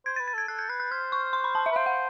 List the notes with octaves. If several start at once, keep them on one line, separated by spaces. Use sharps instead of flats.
C5 G#6
A6
B4
A6
A4 G#6
A4 F#6
G6
B4 F#6
F#6
C5 F6
C#6
C6
B5
A5
E5
B4
C5 F5
F#5